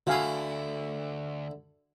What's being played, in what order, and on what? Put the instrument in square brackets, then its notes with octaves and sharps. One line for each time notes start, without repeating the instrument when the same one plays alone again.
[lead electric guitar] D2 [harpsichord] D3 E4 [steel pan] F#4 F5 G#5